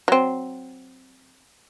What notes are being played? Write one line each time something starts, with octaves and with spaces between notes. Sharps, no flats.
F#3 C4